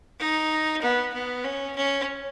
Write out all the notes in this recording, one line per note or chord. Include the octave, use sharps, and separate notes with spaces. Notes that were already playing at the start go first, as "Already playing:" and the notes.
D#4
B3
B3
C#4
C#4